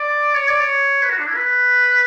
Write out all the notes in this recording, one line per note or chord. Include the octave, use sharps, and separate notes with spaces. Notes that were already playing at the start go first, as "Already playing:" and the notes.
Already playing: D5
C#5
D5
C#5
B4
F#4
D4
E4
B4